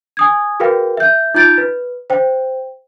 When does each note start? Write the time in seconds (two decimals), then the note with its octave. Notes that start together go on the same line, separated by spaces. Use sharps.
0.17 G#5 D#6 G#6
0.60 F#4 G#4 A#4 B4 F5 G5
0.97 E5 G6
1.34 D#4 F4 G6 A6 D7
1.58 B4
2.10 C5 G5